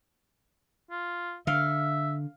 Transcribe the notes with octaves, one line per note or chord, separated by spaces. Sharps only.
F4
D3 E5 F5